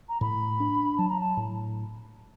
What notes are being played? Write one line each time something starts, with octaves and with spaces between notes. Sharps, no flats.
A#5
A2 B5
D4
F#3 A5
A#5
A5
A2